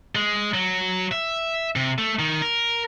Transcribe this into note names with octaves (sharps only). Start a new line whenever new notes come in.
G#3
F#3
E5
C3
A3
D#3
A#4